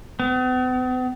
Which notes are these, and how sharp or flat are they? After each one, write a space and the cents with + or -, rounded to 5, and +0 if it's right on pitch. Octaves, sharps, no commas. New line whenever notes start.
B3 +45